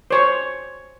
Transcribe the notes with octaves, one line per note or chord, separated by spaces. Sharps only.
C5 C#5